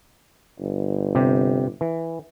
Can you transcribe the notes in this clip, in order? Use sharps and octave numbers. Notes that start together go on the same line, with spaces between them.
G1
C3 G4
E3